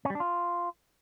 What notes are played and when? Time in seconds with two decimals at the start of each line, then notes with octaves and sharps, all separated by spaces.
0.05 C#4
0.10 G3
0.15 D4
0.20 F4